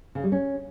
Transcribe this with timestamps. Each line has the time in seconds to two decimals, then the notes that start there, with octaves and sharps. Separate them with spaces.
0.15 C#3
0.24 G3
0.32 C#4